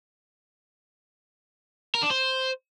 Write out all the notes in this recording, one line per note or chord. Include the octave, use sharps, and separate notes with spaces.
A#4
D4
C5